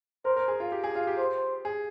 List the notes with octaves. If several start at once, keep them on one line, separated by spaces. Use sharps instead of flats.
A#4 C5
A#4
G#4
F4
G4
G#4
F4
G4
C5
G#4